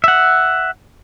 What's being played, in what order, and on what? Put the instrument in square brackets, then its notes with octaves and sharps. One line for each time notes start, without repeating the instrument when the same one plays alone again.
[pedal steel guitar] E5 F#5